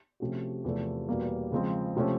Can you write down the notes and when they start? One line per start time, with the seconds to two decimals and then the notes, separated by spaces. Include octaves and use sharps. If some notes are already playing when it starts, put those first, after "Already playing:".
0.20 C3 F3 A3 C#4 F#4
0.64 E2 C3 F3 A3
1.09 E2 B2 G3 A#3
1.52 C#3 F3 G#3 C4
1.97 C3 F3 A3 C#4